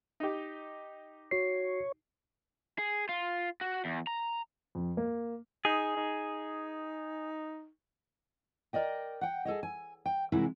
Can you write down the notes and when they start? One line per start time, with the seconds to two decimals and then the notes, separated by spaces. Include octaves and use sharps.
0.20 D#4 G4
1.31 F#4 C#5 C7
2.78 G#4
3.09 F4
3.61 F#4
3.85 E2
4.07 A#5
4.75 F2
4.97 A#3
5.65 D#4 G#4
5.97 D#4
8.73 A#4 D5 D#5 G5
9.21 F#5 G5
9.45 G#4 A4 C#5 D#5
9.63 G#5
10.06 G5
10.32 C3 E3 G#3 E4 F#4 A#4